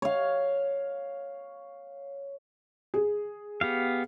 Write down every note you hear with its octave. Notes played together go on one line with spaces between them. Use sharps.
C#5 F5
G#4
B3 G4 F5